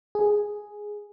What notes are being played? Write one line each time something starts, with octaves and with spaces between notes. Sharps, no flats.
G#4